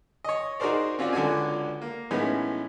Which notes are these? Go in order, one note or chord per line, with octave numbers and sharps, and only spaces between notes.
C#5 D#5
D#4 F#4 G#4 A#4 C5 D5
C4 C#4 F4 F#4 D5
C#2 D3 D4 F#4 G#5
A#3
A2 E3 G#3 B3 C#4 D#4